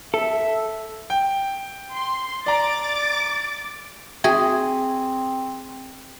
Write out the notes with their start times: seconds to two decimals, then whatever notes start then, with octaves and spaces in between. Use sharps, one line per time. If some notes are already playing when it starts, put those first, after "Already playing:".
0.14 A4 E5
1.10 G5
1.93 C6
2.46 D5 A#5 D6 A6
4.24 C4 F#4 G#4 E5 G5